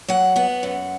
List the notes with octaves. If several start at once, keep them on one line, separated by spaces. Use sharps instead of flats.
F#3 F#5
B3 F#5
F#2